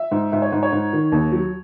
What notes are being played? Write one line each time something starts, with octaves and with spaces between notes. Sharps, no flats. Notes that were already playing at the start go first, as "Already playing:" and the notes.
Already playing: E5
G#2
G#2 E5
C#5
G#2
C#5
G#2
D#3
D#2
F#3